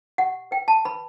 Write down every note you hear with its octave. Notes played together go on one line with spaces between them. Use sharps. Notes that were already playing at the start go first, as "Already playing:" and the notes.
G4 F#5
B4 G5
A5
B4 B5